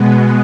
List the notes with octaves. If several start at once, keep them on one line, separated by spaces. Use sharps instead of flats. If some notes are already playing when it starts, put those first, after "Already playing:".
Already playing: B2 G#3 B3